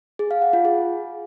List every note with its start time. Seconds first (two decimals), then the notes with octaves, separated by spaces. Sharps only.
0.19 G#4
0.31 F5
0.42 F#5
0.53 F4
0.65 G#4